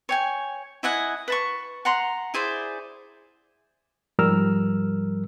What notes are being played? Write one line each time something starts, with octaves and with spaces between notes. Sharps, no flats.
C#5 G5 G#5
E4 D#5 F#5 G#5
B4 A5 C#6
F#5 A#5 C6
E4 G#4 C5 D5
G#2 F3 G3 A#4 E6 F6